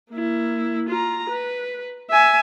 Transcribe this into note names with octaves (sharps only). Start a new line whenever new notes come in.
A#3 E4
F4 A#5
B4
E5 G#5